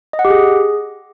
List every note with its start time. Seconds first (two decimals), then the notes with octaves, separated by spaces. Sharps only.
0.13 D#5
0.19 F#5
0.25 G4
0.30 G#4